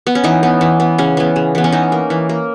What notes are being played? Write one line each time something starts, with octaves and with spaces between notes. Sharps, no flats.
B3
C#4
E3 D#4
B3
E3
B3
C#3 C#4
E3 B3
C#3
E3 B3
C#4
E3 D#4
A#3
E3
A#3